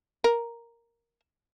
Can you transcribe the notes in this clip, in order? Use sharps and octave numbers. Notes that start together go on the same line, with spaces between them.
A#4